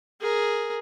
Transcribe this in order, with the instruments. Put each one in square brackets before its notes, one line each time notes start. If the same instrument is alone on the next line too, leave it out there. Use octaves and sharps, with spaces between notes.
[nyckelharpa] G#4 A#4